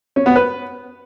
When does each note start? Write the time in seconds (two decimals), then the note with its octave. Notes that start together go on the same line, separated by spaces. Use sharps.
0.16 C#4
0.26 B3
0.36 B4